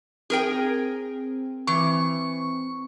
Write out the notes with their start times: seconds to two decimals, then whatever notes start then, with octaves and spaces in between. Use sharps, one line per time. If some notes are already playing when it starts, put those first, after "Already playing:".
0.30 C4 G#4 A#4 G5
1.67 E3 C#6